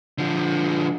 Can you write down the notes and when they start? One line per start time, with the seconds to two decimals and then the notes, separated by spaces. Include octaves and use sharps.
0.18 D3 F3